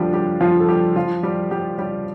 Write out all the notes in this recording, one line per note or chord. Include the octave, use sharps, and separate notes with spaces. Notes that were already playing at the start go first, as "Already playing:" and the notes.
Already playing: D3 F3 G3 D4 F4 G4
G3 G4
F3 F4
A4
G3 G4
F3 F4
G3 G4
G3 G4
G3 G4